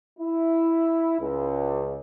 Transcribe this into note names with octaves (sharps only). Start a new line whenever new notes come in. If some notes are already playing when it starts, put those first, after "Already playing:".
E4
C#2